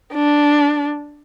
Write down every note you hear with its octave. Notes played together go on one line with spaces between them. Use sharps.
D4